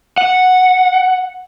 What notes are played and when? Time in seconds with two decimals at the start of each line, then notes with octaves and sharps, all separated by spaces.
0.18 F#5